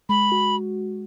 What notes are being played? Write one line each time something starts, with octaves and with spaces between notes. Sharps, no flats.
G#3 B5
F#4